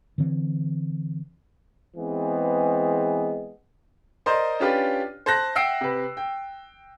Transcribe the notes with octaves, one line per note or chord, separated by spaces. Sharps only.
D3 E3 C4
E3 G#3 B3 C4 G#4
A#4 C5 D5 D#5 A#5 C6
C#4 D4 F4 G4 B4 D5
C5 A5 F#6 A#6
E5 F#5 G5 E6 C7 D7
C3 B4
G5